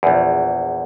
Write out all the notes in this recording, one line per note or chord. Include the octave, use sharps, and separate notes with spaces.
A#1 E2